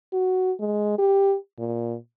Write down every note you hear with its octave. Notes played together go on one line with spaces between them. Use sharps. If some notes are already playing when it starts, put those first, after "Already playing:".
F#4
G#3
G4
A#2